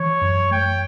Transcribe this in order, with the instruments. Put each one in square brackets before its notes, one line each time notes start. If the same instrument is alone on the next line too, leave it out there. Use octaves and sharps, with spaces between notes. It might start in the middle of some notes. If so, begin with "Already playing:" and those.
Already playing: [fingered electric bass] E3 [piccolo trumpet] C#5
[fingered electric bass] F#2
[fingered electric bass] A3 [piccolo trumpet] G5